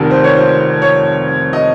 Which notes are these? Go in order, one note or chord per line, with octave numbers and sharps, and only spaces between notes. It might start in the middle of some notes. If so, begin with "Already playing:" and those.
Already playing: F1 F2 D#3
C5
C#5
C5
C#5
D#5